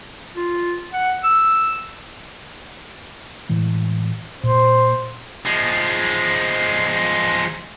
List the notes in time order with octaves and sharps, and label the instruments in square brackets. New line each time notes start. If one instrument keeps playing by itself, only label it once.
[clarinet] F4
F#5
E6
[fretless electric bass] A2 E3 G#3
[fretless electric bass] A#2 [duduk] C5
[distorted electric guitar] F3 G#3